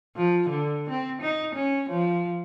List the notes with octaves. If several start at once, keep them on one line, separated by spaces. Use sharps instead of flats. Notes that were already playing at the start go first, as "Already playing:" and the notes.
F3
D3
C4
D#4
C#4
F3